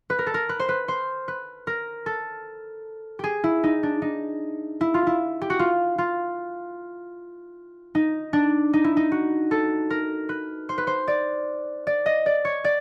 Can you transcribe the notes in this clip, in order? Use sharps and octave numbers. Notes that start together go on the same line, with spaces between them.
B4
A#4
A4
A#4
B4
C5
B4
C5
B4
A#4
A4
G4 G#4
E4
D#4
D4
D#4
E4
F4
E4
G4
F#4
F4
F4
D#4
D4
D#4
E4
D#4
F#4
A4
A#4
B4
C5
B4
C5
D5
D5
D#5
D5
C#5
D5